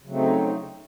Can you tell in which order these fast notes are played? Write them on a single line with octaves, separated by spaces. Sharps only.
C#3 F#3 A3 C4 D#4